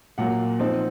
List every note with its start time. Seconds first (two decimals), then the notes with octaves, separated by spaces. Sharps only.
0.18 A#2 F#3 A#3 F#5
0.59 F3 C4 D#4